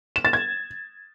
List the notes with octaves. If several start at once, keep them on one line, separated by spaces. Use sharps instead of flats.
E7
A6
G#6